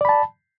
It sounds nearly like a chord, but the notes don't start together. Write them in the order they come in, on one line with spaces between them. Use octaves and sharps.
D5 B5 A5